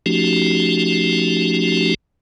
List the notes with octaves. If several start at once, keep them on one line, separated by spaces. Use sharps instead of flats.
F3 A3 C#4 D#4 F#4 G4